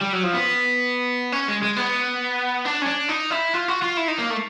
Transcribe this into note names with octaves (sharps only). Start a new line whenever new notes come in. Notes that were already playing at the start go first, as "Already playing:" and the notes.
G3
F#3
F3
B3
C#4
G#3
G#3
B3
D4
C#4
D4
D#4
E4
F4
F#4
F4
E4
D#4
A#3
A3